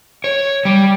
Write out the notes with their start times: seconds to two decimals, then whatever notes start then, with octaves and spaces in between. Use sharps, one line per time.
0.24 C#5
0.65 G3